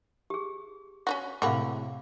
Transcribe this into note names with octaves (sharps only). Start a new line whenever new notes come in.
G4 G#4
C#4 D#4 F#4
A2 C3 G#3 A#3 F#4 F5 B5 D6